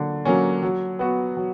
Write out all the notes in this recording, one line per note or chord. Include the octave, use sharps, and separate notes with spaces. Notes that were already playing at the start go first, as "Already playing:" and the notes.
Already playing: D3 F#3 A#3
F#3 A#3 C#4
F#3
B3 F#4
F#3